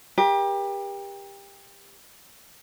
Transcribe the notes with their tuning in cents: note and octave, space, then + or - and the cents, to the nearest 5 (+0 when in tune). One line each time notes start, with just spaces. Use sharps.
G4 +25 A#4 +45